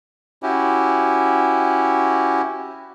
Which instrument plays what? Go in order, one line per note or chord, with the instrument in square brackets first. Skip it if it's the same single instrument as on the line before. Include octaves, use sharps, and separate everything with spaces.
[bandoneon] C#4 E4 F#4 G4